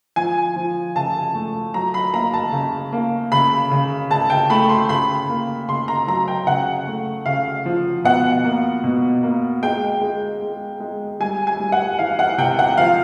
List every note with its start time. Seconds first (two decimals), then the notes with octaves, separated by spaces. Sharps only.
0.16 F3 G#5
0.56 F3
0.96 C#3 A5
1.35 A3
1.74 F#3 A#5
1.94 B5
2.14 A#3 A#5
2.34 A5
2.52 C#3
2.92 A#3
3.32 C#3 B5
3.71 C#3
4.10 C#3 A5
4.30 G5
4.50 A3 B5
4.69 C6
4.89 C#3 B5
5.29 A#3
5.68 C#3 C6
5.88 A#5
6.08 F#3 A#5
6.28 G5
6.47 C#3 F#5
6.87 A3
7.26 C#3 F5
7.66 F3
8.04 B2 F#5
8.44 A#3
8.84 B2
9.23 A#3
9.62 G#3 G5
10.01 G#3
10.42 G#3
10.80 G#3
11.20 G3 G#5
11.47 G#5
11.60 G3
11.72 F#5
11.99 E3 F5
12.19 F#5
12.38 C3 G5
12.59 F#5
12.78 F3 F5